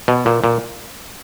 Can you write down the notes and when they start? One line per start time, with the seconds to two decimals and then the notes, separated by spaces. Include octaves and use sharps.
0.08 B2
0.26 A#2
0.44 A#2